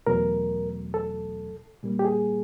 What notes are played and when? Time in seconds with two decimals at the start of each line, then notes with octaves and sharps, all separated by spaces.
0.07 E2 B2 F#3 A3 A#4
0.94 A4
1.83 A#2 G3 A#3
1.99 G4
2.05 G#4